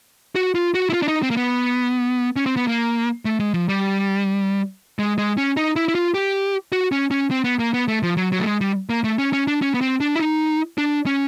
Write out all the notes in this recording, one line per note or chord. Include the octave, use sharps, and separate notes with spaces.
F#4
F4
F#4
E4
F4
D4
D#4
C4
A#3
B3
C#4
C4
B3
A#3
A3
G#3
F3
G3
G#3
G#3
C#4
D#4
E4
E4
F4
G4
F#4
C#4
C#4
C4
B3
A#3
B3
A3
F3
F#3
F#3
A3
G#3
G3
A#3
A3
C#4
C#4
D4
C#4
B3
C4
D4
E4
D#4
D4
C#4